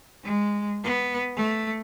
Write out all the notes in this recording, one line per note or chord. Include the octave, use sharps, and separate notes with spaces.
G#3
B3
A3